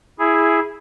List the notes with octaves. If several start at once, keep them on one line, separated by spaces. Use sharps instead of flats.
E4 G#4